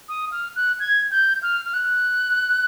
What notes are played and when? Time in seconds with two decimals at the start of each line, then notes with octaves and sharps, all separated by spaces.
0.09 D#6
0.32 F6
0.56 F#6
0.80 G#6
1.11 G6
1.43 F6
1.66 F6
1.74 F#6